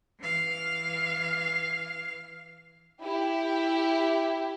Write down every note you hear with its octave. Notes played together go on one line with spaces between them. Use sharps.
E3 F5
E4 G4